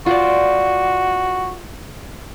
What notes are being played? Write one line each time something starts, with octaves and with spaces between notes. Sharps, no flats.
F4 F#4 C5 D5